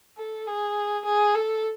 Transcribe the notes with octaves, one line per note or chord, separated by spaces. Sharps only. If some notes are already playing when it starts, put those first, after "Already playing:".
A4
G#4
G#4
A4